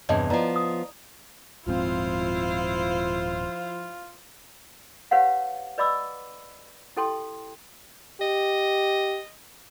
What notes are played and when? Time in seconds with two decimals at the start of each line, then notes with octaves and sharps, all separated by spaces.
0.09 E2 G2 C3 C#5 D#5 A5
0.30 F3 B3 E4 D5 A#5
0.56 D#6
1.67 D#1 G#2 F3 C4 E4 F4 C5 F5
5.11 G4 B4 C#5 F5 F#5
5.78 B4 D5 D#5 B5 D6 E6
6.96 E4 G4 A4 G5 A5 C6
8.21 G4 D#5